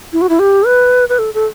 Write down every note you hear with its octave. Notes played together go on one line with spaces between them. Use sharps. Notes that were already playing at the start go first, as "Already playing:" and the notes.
E4
F#4
E4
G4
B4
B4
A4
A4